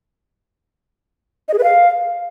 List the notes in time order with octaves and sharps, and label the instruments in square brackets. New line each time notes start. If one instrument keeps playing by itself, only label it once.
[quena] D#5
G#4
B4
F5